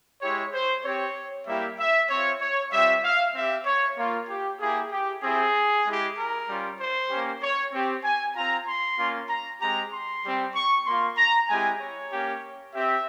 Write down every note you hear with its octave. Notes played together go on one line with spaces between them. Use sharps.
G#3 E4 G4 C#5
C5
C4 G4 C#5
G3 A#3 E4 G4 E5
E5
C4 F4 C#5
C#5
G3 C4 F4 E5
F5
C4 G4 E5
C#5
A#3 F4
G4
A#3 E4 G4 G#4
G4
C4 E4 G4 G#4
G#3 E4 G4
A#4
G3 C#4 F4
C5
A#3 C#4 G4
C#5
C4 G4
G#5
C4 F4 A#5
C6
A#3 C#4 F4
A#5
G#3 C4 G4 A#5
C6
G3 C4 G4
C#6
A#3 F4 C6
A#5
G#3 C4 E4 G4 G#5
C#5
A#3 C#4 G4
C4 G4 E5